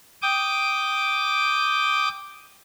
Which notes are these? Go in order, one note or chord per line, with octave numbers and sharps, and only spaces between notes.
G5 D6 D#6